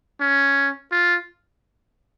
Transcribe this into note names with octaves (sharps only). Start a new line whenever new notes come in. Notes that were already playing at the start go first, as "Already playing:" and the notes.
C#4
F4